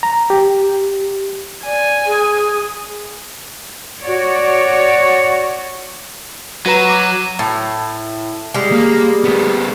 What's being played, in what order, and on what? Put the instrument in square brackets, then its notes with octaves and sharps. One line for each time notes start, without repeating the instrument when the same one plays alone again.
[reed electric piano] A#5
G4
[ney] D5 [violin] G#5
[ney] G#4
[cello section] F#4 C#5 D5
[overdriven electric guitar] F#3 [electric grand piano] F#4 B4 A#5 [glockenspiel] D#7 E7
[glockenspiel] D6
[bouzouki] A2
G3 G#3
[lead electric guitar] A#3
A3 B3